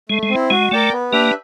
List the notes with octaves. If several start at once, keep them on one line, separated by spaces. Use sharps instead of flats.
G#3 A3
G#3
C4
E4
G#3 F#4
A3 A#4 D5 G5
B3
A#3 D4 G4 B4 E5